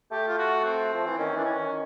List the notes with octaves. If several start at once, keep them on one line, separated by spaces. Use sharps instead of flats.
A3 G4
F4
F#4
C4
F3
E3
D#3 C#4
E3 D4
C#4
D#3